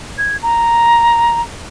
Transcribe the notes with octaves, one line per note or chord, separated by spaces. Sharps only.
G#6
A#5